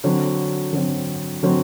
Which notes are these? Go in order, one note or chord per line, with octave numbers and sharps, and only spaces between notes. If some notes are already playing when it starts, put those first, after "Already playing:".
D3 F#3 C4
D3 F#3 C4
D3 F#3 C4